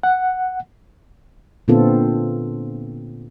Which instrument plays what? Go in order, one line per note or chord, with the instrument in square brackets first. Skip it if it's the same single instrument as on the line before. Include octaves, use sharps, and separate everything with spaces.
[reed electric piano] F#5
[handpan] A#2 D3 B3 C4 F4 A4